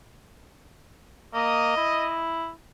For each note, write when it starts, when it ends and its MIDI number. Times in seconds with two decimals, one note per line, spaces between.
1.34 1.77 58
1.34 2.21 75
1.77 2.50 64